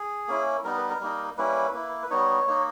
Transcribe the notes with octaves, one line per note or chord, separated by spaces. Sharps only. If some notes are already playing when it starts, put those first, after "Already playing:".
Already playing: G#4
A#3 C#4 E4
G3 B3 D#4 A#4
B4
A#4
G3 A#3 D#4
G3 A#3 C#4 E4 B4
A#3 E4
B4
G3 B3 D#4 C#5
A#3 D#4